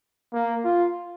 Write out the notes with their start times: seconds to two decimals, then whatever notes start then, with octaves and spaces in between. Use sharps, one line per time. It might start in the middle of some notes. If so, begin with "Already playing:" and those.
0.33 A#3
0.64 F4